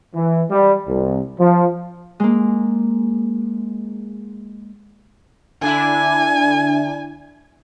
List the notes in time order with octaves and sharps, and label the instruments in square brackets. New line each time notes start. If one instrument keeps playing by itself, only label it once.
[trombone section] E3
G3
C2
F3
[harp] G#3 A#3
[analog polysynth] D3 D4 E4 [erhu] G#5